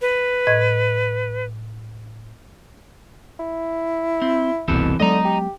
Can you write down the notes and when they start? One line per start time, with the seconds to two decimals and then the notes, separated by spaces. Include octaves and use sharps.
0.01 B4
0.47 A2 D#5 G#6
3.39 E4
4.22 C4
4.68 F1 C2 B2 E3 C4 A4
5.00 D3 F#3 G#3 B3 D#5 A#5
5.25 G4